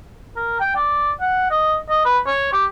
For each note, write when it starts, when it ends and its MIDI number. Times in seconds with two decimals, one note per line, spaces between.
0.36 0.57 70
0.60 0.76 79
0.76 1.11 74
1.21 1.49 78
1.51 1.76 75
1.89 2.03 75
2.05 2.19 71
2.27 2.51 73
2.53 2.65 67